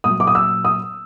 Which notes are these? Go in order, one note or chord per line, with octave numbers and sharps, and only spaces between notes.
A#2 F#3 D#6
D6
D#6
E6
D#6